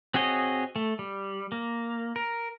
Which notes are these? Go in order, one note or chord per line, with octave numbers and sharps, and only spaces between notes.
C4 F#4 G#4 C#5 D#5
A3
G3
A#3
A#4